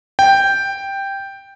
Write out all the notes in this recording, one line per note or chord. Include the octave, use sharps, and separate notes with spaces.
G5